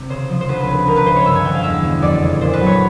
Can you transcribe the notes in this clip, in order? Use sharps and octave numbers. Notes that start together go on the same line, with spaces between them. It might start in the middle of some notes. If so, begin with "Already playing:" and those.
Already playing: C3
C#3 C5
F3
C5
D2 B4
B4
C#3
B4
C#2 A#4
B4
C#3 C5
C#5
G2 E5
G#5
D3 G5
F5
E2 E5
B2
F2 D5
C#3
A#2 C5
B4
F#3
C#5